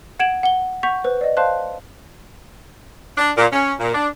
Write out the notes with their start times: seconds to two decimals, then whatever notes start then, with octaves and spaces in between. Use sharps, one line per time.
0.20 F#5 G#6 D7 E7 F#7
0.43 F#5 G7
0.83 F#5 C#6 G6 B6 F7
1.04 B4 C5
1.21 D5 D#5
1.37 C5 F5 A5 C6 F#6
3.17 D4
3.36 A#2
3.51 C#4
3.80 A#2
3.93 D4